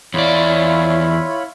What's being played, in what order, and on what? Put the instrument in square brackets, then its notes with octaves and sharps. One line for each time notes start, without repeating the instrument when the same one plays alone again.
[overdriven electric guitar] E2 D5 [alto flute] E4 [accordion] F4 C#5 B5